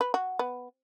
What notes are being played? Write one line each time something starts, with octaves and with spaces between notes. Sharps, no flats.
B4
F#4
B3